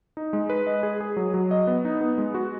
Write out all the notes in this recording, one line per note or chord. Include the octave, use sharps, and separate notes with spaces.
D#4
G#3
B4
D#5
G#4
G#4
F#3
F#3
D#5
B3
D#4
B3
G#3
F#4